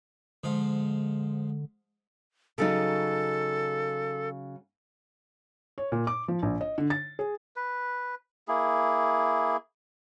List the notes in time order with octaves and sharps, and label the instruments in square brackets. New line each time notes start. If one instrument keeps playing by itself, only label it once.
[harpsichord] G#2 F3 F4 [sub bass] D3
[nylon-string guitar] C#3 F#3 D#4 [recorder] A4
[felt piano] C#5
A#2
D6
F3
A#1
D#5
D3
A6
G#4
[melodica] B4
A#3 E4 G#4